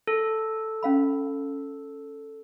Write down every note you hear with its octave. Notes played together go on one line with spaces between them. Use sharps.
A4
C#4 F5 B5